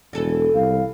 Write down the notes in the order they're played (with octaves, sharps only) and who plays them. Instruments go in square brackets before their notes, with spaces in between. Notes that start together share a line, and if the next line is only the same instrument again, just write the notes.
[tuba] E1 [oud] E3 A4
[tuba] C2 [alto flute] F5